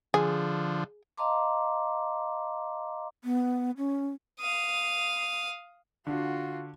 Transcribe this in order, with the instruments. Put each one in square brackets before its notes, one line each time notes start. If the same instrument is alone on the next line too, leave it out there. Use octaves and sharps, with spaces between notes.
[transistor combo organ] D3 F3 [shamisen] G#4
[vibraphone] D#5 F5 A5 A#5 C6 D6
[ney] B3
C#4
[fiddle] F5 D#6
[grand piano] D3 [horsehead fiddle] F4 F#4